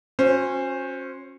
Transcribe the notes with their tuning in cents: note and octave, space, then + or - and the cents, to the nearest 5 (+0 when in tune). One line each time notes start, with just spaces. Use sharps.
C#4 -20 F#4 -35 C5 +0